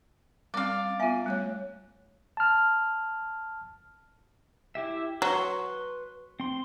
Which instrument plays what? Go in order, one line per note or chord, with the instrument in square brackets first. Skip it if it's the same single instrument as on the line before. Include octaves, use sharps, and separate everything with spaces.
[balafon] G3 C4 C#4 [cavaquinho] D5 F5
[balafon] B3 F4 [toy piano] E5 G#5
[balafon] G3 A3 C#5
[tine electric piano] A5 F6
[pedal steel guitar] E4 G4 E5
[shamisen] F#3 [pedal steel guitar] B4 C6 C#6
[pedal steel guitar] C4 C6